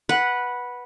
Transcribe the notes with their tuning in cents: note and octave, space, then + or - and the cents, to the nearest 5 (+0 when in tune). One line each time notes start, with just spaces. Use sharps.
B4 -10 F#5 +0